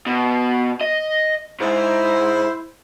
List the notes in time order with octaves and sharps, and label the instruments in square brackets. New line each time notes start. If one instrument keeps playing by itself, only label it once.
[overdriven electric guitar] B2
D#5
[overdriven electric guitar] G#2 [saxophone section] E4 C5